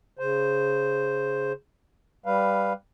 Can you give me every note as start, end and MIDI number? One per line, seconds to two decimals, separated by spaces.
0.19 1.52 49
0.19 1.52 72
2.26 2.73 55
2.26 2.73 71
2.26 2.73 77